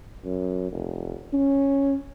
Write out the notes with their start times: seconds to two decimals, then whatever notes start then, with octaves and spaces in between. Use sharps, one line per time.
0.25 F#2
0.72 F1
1.33 C#4